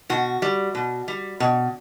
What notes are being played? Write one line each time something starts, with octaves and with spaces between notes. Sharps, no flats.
B2 F#4
G3
B2
G3
B2